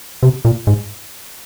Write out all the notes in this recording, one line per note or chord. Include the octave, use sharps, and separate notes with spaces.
C3
A#2
G#2